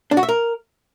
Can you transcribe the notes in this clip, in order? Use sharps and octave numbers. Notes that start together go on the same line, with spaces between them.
D4
F#4
E5
A#4